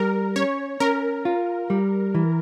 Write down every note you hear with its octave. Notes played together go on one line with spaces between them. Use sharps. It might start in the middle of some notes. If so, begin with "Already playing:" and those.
Already playing: G3 A#4
C#4 C#5
C#4 A#4
F4
G3
E3